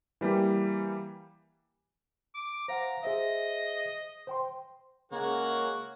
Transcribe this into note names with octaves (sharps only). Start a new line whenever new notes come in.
E3 G3 A#3 G4
D6
C5 F5 F#5 A#5
G#4 C5 D#5 E5
C5 G5 C6
C#3 G#3 A#3 F#4 G#4 A#4 C#5 F#5